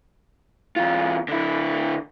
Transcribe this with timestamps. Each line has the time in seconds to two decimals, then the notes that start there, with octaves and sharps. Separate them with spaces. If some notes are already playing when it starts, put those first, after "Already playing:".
0.76 E2 F4
1.28 D3 E4